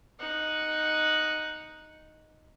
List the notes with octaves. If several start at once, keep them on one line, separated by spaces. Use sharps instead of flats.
D#4 F#5